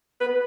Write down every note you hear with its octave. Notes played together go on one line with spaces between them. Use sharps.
B4